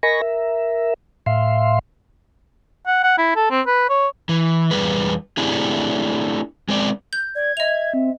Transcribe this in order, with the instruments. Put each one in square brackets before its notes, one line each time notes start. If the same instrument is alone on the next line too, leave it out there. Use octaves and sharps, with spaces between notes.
[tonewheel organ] A#4 D#5 G#5 B5 C#6 A#6
A#4 E5
A2 E5 F5 C6
[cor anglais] F#5
F#5
E4
A4
C4
B4
C#5
[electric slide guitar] E3
E2 G#2 G3 G#4 B4
A3 C4 D4 E4 G4 G#4
G#3 C4 D5
[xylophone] G6
[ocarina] D5 [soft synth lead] G#6
[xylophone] D#5 F7 [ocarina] E5
[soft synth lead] C4